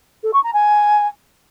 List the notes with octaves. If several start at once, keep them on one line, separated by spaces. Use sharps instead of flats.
A4
C#6
A#5
G#5